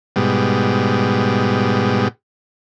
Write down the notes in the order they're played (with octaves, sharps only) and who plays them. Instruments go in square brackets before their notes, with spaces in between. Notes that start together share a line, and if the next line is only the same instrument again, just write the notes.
[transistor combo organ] G#2 B2 G3